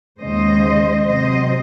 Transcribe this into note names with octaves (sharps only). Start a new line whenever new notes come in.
D#2 C#3 G#3 C5 D#5
C3 F#3 C4 C5 D#5